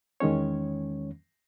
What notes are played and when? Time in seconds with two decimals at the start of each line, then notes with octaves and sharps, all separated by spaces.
0.20 E2 D#3 G#3 C#4 C#5